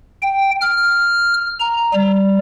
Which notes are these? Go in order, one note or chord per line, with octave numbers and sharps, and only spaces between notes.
G5
F6
A#5
G3